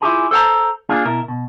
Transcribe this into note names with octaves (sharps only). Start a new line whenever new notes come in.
E4 F4 G4 G#4 G#5 B5
A4 C5 D5 G5 A5 A#5
A#3 D4 F4 G#4
B2 E4 A#4
B2